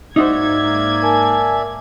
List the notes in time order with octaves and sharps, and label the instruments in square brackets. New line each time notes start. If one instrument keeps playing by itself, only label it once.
[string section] G#2 A#3 G#6 [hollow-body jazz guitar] D#4 F#4 C5 [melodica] D5 E5
[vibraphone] A#4 G#5 A5